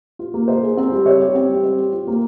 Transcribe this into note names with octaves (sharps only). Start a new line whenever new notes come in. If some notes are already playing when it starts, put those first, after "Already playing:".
F4
A#3
C5
G#4
C4
G3
C#5
G4
C4
G3
C5
G4
F4
A#3